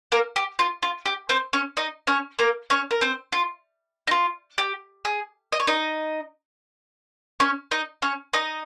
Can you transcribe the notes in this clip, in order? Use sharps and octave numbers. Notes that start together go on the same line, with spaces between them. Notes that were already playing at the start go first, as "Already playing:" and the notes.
A#3 A#4
G4
F4
F4
G4
C4 C5
C#4 C#5
D#4 D#5
C#4 C#5
A#3 A#4
C#4 C#5
A#4
C4 C5
F4
D#4
F4
G4
G#4
D#5
C#5
D#4 D#5
C#4 C#5
D#4 D#5
C#4 C#5
D#4 D#5